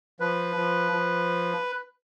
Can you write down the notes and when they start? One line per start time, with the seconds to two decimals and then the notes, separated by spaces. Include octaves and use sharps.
0.20 F3 B4
0.56 F3
0.92 F3